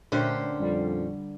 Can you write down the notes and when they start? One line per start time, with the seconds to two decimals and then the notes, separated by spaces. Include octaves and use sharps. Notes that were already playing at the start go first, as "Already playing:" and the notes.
0.12 A#2 D3 A3 C#4 G4 C5
0.60 F2 G3